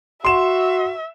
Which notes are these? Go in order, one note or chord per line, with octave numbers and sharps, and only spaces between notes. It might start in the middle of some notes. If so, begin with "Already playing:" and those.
F#4 E5 C6 E7